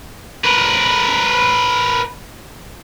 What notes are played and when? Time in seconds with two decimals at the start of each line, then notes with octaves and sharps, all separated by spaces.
0.45 A#4 B4